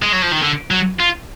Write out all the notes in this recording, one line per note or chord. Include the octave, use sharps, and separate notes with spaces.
G#3
F#3
F3
D#3
D3
F#3
F4